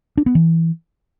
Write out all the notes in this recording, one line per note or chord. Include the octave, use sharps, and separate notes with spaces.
D4
B3
E3